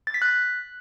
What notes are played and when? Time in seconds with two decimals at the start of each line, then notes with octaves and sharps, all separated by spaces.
0.07 A6
0.14 B6
0.22 F#6